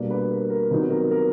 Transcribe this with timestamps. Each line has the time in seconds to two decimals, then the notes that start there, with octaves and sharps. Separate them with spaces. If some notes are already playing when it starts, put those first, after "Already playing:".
Already playing: B2 G3 A#3 D4
0.10 B4
0.30 A#4
0.50 A#4
0.70 C3 D#3 F#3 B3 D#4 B4
0.90 A#4
1.11 A#4